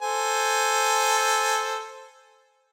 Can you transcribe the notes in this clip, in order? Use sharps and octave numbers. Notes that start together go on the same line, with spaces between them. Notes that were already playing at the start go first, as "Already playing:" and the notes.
A4 C5 G#5